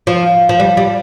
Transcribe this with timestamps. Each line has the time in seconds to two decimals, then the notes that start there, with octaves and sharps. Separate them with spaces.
0.07 F3
0.49 F3
0.60 G3
0.77 G3